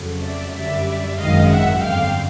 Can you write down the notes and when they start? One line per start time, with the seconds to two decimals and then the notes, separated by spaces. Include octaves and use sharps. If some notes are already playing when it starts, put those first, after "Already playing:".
Already playing: F2 C#3 F#3 A3
0.23 D5 E5
0.55 F#2 D3 G3 D5 E5
1.17 G#1 F#2 D#3 G#3 D#5 F5
1.50 E5 F#5
1.80 G1 F2 D3 F5 G5